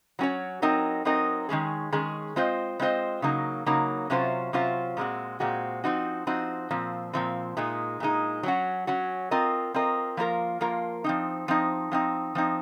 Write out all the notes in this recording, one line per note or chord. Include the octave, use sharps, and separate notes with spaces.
F#3 C#4 F#4 C#5
F#3 C4 D#4 A#4 D#5
F#3 C4 D#4 A#4 D#5
D#3 G#3 C#4 G#4
D#3 G#3 C#4 G#4
G#3 C4 F4 C5 D#5
G#3 C4 F4 C5 D#5
C#3 F#3 A#3 D#4
C#3 F#3 A#3 D#4
C3 F#3 C#4 F4 C5
C3 F#3 C#4 F4 C5
A#2 G#3 C4 F#4
A#2 G#3 C4 F#4
F3 C4 D#4 F#4
F3 C4 D#4 F#4
A#2 F3 C4
A#2 F3 C4
A#2 G#3 D#4
A#2 G#3 D#4
F#3 C#4 F#4
F#3 C#4 F#4
C4 F4 A#4 D#5
C4 F4 A#4 D#5
F3 A#3 F4 A#4
F3 A#3 F4 A#4
F3 C4 D#4
F3 C4 D#4
F3 C4 D#4
F3 C4 D#4